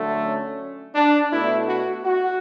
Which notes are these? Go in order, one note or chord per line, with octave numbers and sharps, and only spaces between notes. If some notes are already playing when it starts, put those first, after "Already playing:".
Already playing: D3 F#3 A3
C#4
D4
B2 A3 E4
F#4
F#4